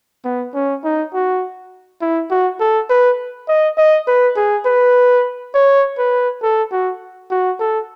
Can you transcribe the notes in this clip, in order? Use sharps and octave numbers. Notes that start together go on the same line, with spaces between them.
B3
C#4
D#4
F#4
E4
F#4
A4
B4
D#5
D#5
B4
G#4
B4
C#5
B4
A4
F#4
F#4
A4